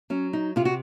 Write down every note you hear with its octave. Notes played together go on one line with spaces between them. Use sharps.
F#3 C#4
D#4
C3 F4
F#4